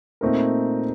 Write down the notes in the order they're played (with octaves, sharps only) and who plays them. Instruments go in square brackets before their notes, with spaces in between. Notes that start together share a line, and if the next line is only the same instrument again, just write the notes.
[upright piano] A#2 A3 C4 D#4 A#4